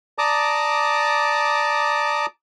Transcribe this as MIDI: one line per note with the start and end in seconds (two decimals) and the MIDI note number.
0.18 2.26 74
0.18 2.26 81
0.18 2.26 82
0.18 2.26 86
0.18 2.26 87